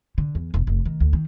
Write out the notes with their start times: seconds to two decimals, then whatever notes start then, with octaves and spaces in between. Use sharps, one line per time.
0.18 D3
0.35 E2
0.54 E1
0.67 F1
0.85 D#3
1.00 D2
1.13 D#3